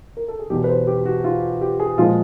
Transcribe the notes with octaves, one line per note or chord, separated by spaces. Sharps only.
A#4
A4
G#4
E2 B2 F#3 G4
B4
C5
G4
F#4
F4
G4
G#4
A#2 F3 G#3 F4